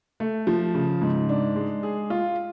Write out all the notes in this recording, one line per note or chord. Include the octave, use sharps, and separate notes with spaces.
A3
F3
C#3
G#2
D4
G#3
G#4
F4